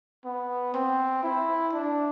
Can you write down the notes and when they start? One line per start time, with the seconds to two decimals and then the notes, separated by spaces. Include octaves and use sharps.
0.25 B3
0.74 C4
1.23 E4
1.73 D4